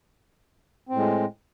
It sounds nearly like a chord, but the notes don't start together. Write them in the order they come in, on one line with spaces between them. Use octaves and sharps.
C4 A2 G#3